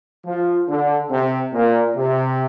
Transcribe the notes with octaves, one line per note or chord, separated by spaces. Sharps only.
F3
D3
C3
A#2
C3